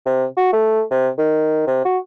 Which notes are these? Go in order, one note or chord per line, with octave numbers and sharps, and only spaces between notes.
C3
F#4
A3
C3
D#3
C3
F#4